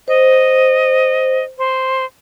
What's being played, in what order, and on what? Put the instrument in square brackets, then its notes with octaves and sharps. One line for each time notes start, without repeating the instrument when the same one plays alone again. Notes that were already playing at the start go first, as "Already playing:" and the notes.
[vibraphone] C5 [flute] D#5
[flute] C5